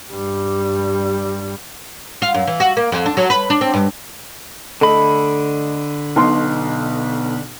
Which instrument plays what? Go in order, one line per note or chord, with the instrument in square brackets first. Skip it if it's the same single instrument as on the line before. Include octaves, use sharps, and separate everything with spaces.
[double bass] G2 G3
[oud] F4
F#2
E3
F#4
A#3
F2
D4
F#3
B4
D4
C4
G2
[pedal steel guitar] D3 B5 [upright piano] A3 D#5
[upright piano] B1 B2 C6